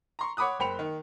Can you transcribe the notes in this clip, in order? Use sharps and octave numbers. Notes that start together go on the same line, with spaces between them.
A#5 C6 C#6
C#5 F#5 B5 D6 D#6 F#6
F#1 C5 G5 B5 C#7 F7
D#3